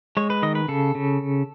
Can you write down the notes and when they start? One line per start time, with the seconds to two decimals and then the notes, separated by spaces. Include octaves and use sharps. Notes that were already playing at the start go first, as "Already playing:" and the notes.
0.17 G#3 C#5
0.30 B4
0.43 D#3 D#5
0.55 B4
0.68 C#3 A4
0.95 C#3